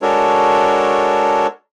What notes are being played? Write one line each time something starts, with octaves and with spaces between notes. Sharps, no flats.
G#3 D4 F#4 A4 A#4 C#5